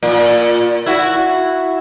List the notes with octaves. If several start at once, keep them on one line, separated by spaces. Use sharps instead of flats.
A#2
E4 F#4